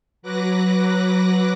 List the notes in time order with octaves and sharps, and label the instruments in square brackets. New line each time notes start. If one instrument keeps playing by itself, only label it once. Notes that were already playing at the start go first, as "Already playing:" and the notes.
[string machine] F#3 B4 D6 F#6 A#6